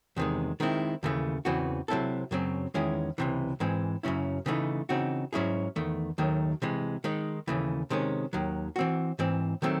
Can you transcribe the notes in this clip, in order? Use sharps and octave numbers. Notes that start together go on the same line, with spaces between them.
E2 C3 D#3 G#3
D#3 G#3 C4 E4
D#2 C#3 E3 A3
E2 C#3 E3 C4 F#4
C3 F#3 C4 E4 A4
F#2 C#3 F#3 C4
E2 D#3 G#3 C#4 E4
C#2 C3 E3
G#2 E3 G#3 C4
F#2 C#3 F#3 C#4 E4
C#3 E3 A3 C4 D#4
C#3 E3 C4 D#4 F#4
G#2 F#3 C#4 E4 G#4
E2 D#3 A3
D#2 D#3 F#3 A3
C3 E3 G#3
D#3 G#3 D#4
D#2 C#3 E3 A3
C3 D#3 G#3 C#4
D#2 D#3 F#3
E3 C4 F#4
G#2 E3 C4
D#3 F#3 A3 C4